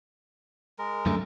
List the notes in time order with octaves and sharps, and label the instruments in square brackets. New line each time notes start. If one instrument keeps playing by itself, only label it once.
[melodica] G#3 A#4
[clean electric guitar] F#2 D3 A3